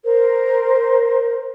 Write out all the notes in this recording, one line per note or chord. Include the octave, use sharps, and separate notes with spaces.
A#4 C5